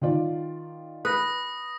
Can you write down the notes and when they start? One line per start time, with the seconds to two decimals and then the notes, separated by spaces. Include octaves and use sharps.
0.01 D#3 F4 D5
1.05 B4 D#6 A#6